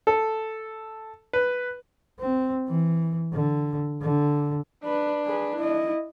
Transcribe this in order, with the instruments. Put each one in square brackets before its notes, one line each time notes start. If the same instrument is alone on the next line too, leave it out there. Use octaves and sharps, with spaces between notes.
[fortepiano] A4
B4
[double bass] C4
E3
D3
D3
[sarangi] D4 [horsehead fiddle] B4
[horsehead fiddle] G#4 B4
E4 D#5